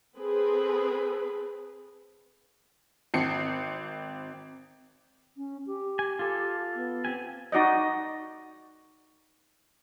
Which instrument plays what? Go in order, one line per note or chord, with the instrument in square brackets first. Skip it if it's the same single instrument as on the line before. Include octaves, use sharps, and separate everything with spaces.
[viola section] C4 G#4 A4 B4
[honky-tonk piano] G#1 C4 C7 C#7
[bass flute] C#4
G4
[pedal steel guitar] G#5
F4 A4
[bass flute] B3
[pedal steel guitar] C4 G4 G#5
[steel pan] D#4 F#4 D5 D#5